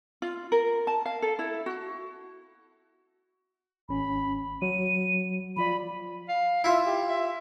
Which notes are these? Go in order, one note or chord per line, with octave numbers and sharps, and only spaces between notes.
F4
A#4
A5
F5
A4
E4
F#4
G#1 C#4 B5
F#3 D#7
F3 F4 D5 B5
F5
E4 F4 E5
G4
E5